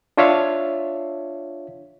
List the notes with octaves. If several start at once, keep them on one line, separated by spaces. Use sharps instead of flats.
D4 F4 C#5 E5 F5